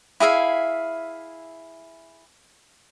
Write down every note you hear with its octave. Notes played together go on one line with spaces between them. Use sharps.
E4 G#4 E5 F5